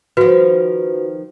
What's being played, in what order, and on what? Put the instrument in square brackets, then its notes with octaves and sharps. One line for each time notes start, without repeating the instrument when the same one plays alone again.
[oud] D#3 F3 [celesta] F#4 B4